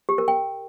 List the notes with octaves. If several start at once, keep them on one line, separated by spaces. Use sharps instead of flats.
G4
A#4
G5